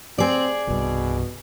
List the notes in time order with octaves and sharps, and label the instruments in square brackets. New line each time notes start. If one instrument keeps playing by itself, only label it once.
[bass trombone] C4 [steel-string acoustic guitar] G#4 D5
[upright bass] C2 G2 [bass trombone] B2